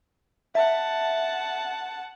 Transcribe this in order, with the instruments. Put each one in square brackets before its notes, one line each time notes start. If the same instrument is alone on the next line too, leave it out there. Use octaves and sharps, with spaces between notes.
[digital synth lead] E5 [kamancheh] F#5 A5